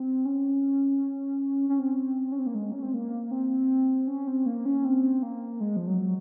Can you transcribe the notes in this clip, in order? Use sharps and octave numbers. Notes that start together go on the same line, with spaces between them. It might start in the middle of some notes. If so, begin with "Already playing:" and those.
Already playing: C4
C#4
C#4
C4
C#4
C4
A#3
G#3
C#4
C4
A#3
C4
C#4
C4
A#3
C#4
C4
A#3
G#3
F3
F#3